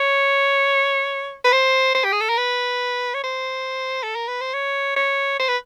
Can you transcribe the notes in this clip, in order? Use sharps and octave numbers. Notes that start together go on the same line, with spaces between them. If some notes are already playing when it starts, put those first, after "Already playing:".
Already playing: C#5
B4
C5
C5
G4
G#4
A4
A#4
B4
C#5
C5
A4
A#4
B4
C5
C#5
C#5
C5
B4